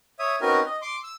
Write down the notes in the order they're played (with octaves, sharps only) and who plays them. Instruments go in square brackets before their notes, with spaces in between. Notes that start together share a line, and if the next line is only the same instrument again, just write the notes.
[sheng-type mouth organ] C#5 E5 D#6
C4 C#4 D#4 F#4 A#4 B4
D#5
C6 D6
E6